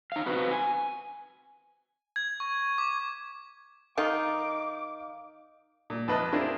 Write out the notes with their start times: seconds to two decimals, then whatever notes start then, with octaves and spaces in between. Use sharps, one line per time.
0.12 D#4 F5
0.26 C4 F#4 B4
0.51 G#5
2.16 G#6
2.40 C#6
2.78 D6
3.98 D#3 D#4 F5 D6
5.90 A#2
6.08 F2 B4 D#5 A5
6.33 C4 D4 E4 F4 G#4 A#4